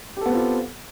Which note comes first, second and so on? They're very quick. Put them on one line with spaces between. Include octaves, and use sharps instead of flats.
G4 A4 B3 C4 F4